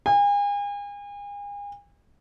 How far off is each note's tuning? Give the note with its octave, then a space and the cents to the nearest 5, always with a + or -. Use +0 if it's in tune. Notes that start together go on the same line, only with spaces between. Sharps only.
G#5 -40